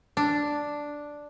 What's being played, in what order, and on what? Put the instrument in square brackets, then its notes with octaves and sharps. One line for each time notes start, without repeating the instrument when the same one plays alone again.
[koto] D4